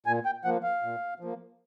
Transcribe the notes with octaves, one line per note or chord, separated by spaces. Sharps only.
A#2 G#5
G5
F3 A#3 F#5
F5
A#2
F3 A#3